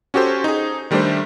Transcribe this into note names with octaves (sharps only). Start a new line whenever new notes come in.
C#4 F#4 G4 A4 C5
D#4 G#4
D#3 G3 A3 D4 G4 C5